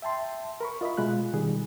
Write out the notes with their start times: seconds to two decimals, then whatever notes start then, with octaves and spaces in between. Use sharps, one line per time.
0.02 E5 G5 A5 C6
0.61 A#4 B5 C#6
0.81 F4 D#5 E5 B5
0.97 B2 G#3 F4 F#6
1.34 B2 D#3 G3 G#4